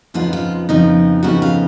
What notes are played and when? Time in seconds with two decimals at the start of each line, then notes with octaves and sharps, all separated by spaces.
0.14 F2 C#3 F3 B3 D#4 F4
0.33 F4
0.69 F2 C#3 F3 B3 D#4
1.23 F2 C#3 F3 B3 D#4 F#4
1.42 F5